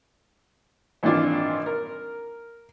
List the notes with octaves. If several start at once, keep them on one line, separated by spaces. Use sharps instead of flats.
G#1 A#2 E3 D4 F4
A#4